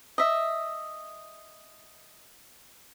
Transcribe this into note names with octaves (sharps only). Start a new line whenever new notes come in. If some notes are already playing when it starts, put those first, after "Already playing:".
D#5 E5